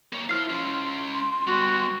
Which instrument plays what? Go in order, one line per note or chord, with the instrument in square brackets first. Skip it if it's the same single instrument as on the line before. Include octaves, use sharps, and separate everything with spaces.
[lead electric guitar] A#3 C#5
[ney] E4 [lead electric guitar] C5 F5 [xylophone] F6 C7
[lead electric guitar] C#4 F4 [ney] C6
[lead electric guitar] G3 B3 [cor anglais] F#4